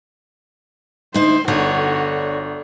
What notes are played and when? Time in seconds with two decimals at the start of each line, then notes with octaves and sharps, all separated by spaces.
1.14 D2 D#4 E4 C5
1.48 G1 D3 F#4 C#5